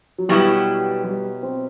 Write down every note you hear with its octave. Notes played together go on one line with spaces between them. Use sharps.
F#3
B2 F#3 G3 B3 E4 G4
G3
C4